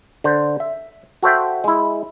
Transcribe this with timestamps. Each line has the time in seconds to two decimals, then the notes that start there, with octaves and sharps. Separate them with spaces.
0.24 D3 C5
0.60 E5
1.23 F#4 A4 C5 E5 G5
1.64 G#3 E4